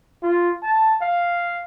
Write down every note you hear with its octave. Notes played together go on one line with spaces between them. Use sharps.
F4
A5
F5